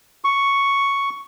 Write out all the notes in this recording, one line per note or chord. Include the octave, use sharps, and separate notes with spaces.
C#6